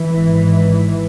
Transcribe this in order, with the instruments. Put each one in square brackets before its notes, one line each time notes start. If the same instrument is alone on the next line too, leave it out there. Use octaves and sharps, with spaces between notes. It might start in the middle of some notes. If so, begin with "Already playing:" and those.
Already playing: [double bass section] E3
G#1 G#2